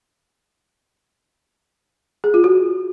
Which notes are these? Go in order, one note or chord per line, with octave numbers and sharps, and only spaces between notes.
G#4
F4
F#4